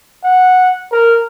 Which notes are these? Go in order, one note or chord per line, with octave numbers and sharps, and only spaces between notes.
F#5
A#4